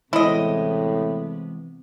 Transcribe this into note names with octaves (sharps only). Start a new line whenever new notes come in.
A2 C3 E3 G#3 B3 E4 C5 D#5